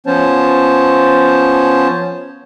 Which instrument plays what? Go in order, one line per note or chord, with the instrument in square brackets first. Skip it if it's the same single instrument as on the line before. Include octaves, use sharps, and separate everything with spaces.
[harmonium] F3 B3 C#4 C5 C#5 A5